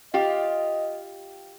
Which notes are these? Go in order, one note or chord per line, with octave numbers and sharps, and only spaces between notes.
F4 G4 D#5